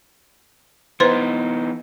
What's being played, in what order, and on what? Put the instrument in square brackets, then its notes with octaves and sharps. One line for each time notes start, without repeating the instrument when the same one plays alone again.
[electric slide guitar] E3 B3 D#4 [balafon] B4 C5 C6